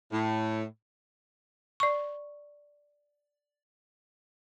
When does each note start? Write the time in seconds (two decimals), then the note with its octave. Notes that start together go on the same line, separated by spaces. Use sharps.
0.12 A2
1.80 D5 C#6